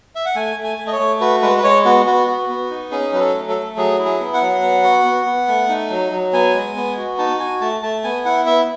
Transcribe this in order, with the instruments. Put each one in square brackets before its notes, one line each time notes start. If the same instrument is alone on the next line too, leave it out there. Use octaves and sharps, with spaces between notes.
[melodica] E5
F#5
A3 G#5
A3
G#5
A3
D#5
C#5
A3
F#4 B4
G#3 B4
B4
G#3 C#5
B3 F#4
B3 F#4
F#4
B3
D#4
C#4 G#4
F#3 B4
A4
A3
A4
A3
F#3 G#4
E4
G#4
B3
F#5
F#3
B3
F#4
B3
B3
A3
D#4
F#3
F#3
B3 G#5
G#3
B3
F#4
D#4 A5
F#4 G#5
A3 A5
A3 A5
B3 G#5
E4 F#5
B3 E5